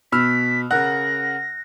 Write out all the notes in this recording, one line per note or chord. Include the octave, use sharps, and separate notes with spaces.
B2 B5 E6 F6 B6
C#3 A#4 F#5 F#6 A#6